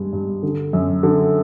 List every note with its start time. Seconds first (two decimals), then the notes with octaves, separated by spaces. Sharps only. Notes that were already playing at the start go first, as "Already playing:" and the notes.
Already playing: G2 G#3
0.13 G2
0.43 D3
0.73 F#2
1.03 D3